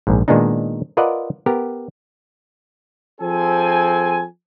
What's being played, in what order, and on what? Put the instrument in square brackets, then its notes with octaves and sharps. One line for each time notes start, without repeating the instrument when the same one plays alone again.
[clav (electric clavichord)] A#1 G#2
A#2 D#3 G#3 B3 D4 D#4
F4 A#4 B4 D5 D#5 F#5
B3 G4 A#4
[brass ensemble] F3 C4 G#4 A4 G#5